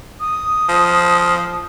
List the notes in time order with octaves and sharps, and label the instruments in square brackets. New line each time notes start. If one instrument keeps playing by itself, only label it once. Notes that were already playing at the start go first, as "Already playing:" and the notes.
[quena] D#6
[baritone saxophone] F3